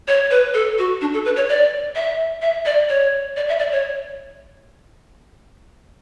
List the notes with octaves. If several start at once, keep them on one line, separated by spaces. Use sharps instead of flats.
C#5
B4
A4
F#4
D4
A4
B4
C#5
D5
E5
E5
D5
C#5
D5
E5
D5
C#5